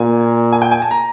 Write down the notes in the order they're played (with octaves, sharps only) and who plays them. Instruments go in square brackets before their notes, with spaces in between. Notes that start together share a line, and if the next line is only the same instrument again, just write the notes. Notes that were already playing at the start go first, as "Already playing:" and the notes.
Already playing: [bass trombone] A#2 [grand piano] G#5
[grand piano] G#5
G5
G#5
A5
A#5